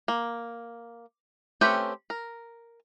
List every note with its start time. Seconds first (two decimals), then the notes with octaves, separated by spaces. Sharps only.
0.08 A#3
1.61 A3 C4 C#4 G4 B4
2.10 A#4